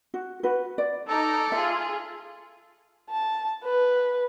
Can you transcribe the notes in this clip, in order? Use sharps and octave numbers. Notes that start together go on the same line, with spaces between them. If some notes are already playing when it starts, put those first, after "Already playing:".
F#4
F#4 B4
D5
D#4 A4 A#5 D6
F4 G#4 E5
A5
B4